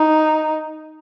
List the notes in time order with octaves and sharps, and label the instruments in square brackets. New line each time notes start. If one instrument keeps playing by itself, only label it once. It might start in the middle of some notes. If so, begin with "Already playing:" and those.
Already playing: [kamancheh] D#4